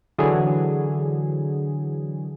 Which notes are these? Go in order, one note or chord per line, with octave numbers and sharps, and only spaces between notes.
D3 E3 F#3 G#4